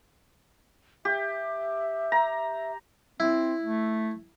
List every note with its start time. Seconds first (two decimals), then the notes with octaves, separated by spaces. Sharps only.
1.05 G4 E5
2.12 A#5
3.20 C4 E4
3.63 A3